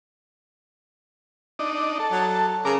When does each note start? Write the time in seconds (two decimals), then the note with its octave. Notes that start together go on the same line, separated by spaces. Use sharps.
1.59 D4 D#4
1.99 A4
2.12 F#3
2.65 C#3 A#4 D6